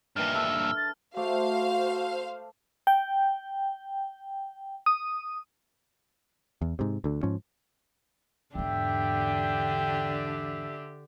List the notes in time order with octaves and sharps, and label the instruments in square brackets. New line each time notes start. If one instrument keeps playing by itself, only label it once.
[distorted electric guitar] G2 A#2 [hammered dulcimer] D#3 E3 D4 [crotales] F6
[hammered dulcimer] D4 A4 [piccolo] E6
[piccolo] A6
[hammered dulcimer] A3 D6 [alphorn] F#4 [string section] C5 F5
[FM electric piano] G5
D#6
[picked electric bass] E2
G#2 C3
D2 D3
G#2 F3 C#4
[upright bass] E2 G#2 [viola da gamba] D3 D4 G4 [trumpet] E5 [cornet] G5